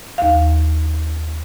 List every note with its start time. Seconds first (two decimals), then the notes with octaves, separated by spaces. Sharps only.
0.18 D#2 F5